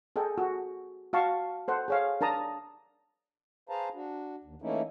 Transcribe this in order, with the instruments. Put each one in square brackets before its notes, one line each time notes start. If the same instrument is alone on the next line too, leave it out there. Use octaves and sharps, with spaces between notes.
[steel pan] G#4 A4 D#5 G5
F#4
F#4 F5 A5 C#6
A4 C5 F#5
G#4 C#5 F5
D4 A#4 A5 A#5 D#6
[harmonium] G#4 B4 C5 F5 A5 A#5
D4 F#4
D#2
E3 A3 A#3 C#4 D#4 E4